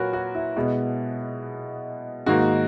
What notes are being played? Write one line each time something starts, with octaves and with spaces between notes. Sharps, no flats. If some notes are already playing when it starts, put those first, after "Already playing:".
Already playing: A#2 F#3 F#4 A#4 B4 C#5
F#4
E4
B2 G#3 B3
G#2 D#3 A#3 F#4